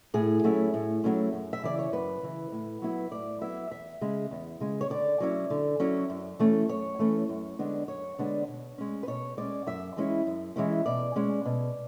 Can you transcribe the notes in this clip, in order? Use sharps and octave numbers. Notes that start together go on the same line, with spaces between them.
A2 G#4
F#3 A3 C#4 E4
A2
F#3 A3 C#4 E4
F#2
E5
C#3 E3 D5
C#5
F#2 B4
C#3 E3
A2
F#3 B3 E4
A2 D5
F#3 B3 E4 E5
E2 E5
C#3 G#3
E2
C#3 G#3
C#5
D3 D5
F#3 C#4 E4
D3
F#3 C#4 E4
F#2
E3 A3 C#4
F#2 C#5
E3 A3 C#4
F#2
D3 G#3 B3 D4
F#2 C#5
D3 G#3 B3 D4
B2
G#3 C#4
B4
B2 C#5
G#3 C#4 D5
F#2 E5
E3 G#3 C#4 E4
F#2
E3 G#3 C#4 E4
B2 D5
G#3 C#4
B2